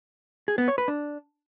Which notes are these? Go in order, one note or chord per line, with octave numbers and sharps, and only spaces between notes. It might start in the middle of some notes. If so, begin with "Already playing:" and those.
G#4
B3
C#5
B4
D4